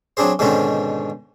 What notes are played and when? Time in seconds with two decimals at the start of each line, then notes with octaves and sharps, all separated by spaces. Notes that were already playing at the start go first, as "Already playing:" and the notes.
0.17 F#3 C4 D4 G#4 C5
0.39 G#2 B2 D3 D#3 C4 C#4